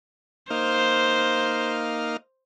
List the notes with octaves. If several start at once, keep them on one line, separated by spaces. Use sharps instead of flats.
A#3 D#4 C5 F5